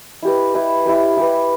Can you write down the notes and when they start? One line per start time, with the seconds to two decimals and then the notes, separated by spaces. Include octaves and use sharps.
0.22 E4 G4 B4
0.54 E4 G4 B4
0.86 E4 G4 B4
1.17 E4 G4 B4